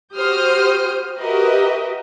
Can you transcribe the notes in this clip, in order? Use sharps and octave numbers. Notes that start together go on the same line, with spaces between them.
F#4 G4 C5 D#6 F6 G6
F#4 G4 A#4 B4 D#5 E5